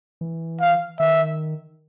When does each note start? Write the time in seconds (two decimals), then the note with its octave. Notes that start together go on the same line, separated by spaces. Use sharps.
0.21 E3
0.60 F5
0.99 D#3 E5